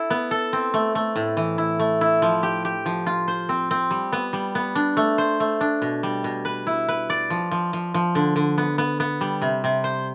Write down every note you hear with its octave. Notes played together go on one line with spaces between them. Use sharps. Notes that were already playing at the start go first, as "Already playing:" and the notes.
Already playing: E4 A4
B3
A4
C4
A3
A3
A2
E3
E4
A3
E4
F3
G4
G4
F3
F4
C5
C4
C4
G3
B3
G3
B3
D4
A3
C5
A3
D4
B2
G3
B2
B4
E4
B4
D5
F3
F3
F3
F3
D3
D3
B3
B3
B3
G3
C3
C3
C5